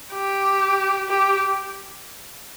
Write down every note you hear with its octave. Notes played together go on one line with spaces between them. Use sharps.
G4
G4